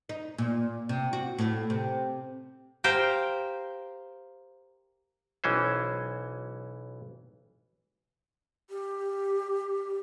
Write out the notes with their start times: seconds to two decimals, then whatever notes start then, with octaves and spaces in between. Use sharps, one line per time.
0.09 D#4
0.38 A#2
0.89 C3
1.13 F#4
1.38 A2
1.70 C3
2.84 G4 A#4 C5 F5 G5 G#5
5.44 B1 E3 C#4 C5
8.70 G4